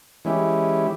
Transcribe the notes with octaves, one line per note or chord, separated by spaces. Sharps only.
E3 G#3 C#4 E4 G4